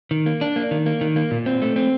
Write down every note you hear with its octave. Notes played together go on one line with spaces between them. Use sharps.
D#3
A#3
D4
A#3
D#3
A#3
D#3
A#3
A#2
C4
A3
C4